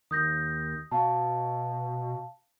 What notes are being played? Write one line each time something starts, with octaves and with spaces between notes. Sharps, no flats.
D#2 D#6 G6 A#6
B2 F5 A5